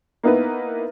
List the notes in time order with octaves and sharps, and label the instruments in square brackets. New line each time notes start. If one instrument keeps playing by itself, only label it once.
[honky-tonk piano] A#3 B3 D#4 E4 B4